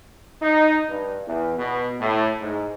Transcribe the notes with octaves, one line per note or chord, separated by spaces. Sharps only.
D#4
G2
E2
B2
A2
G#2